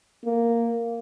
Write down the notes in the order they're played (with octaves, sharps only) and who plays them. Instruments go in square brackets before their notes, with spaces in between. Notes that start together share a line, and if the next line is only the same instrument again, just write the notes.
[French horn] A#3